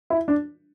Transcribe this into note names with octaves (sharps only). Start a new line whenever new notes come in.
E4
D4